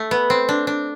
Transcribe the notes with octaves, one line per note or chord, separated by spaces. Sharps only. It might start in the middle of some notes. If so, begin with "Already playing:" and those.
Already playing: A3
B3
C4
D4
D4